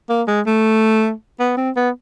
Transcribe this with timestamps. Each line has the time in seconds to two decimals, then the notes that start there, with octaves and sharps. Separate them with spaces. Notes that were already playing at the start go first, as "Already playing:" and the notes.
0.10 A#3
0.28 G#3
0.47 A3
1.40 B3
1.57 C4
1.77 B3